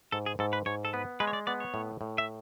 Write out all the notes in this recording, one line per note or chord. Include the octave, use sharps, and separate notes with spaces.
G#2 A4
G#4
G#2 A4
B4
G#2 C#5
A4
B3 B4
G#3 B4
C#5
D5
B3 D5
C#5
A2
A2
E5